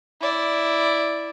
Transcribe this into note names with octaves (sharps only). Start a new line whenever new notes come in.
E4 D5